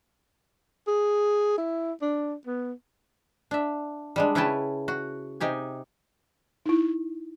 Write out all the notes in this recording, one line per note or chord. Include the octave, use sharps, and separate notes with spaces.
G#4
E4
D4
B3
D4 E5
G3 G#3 D4
C#3 E4 B4 C#5 G5 A5
F#4
C3 D#4 G4 G#5
D#4 E4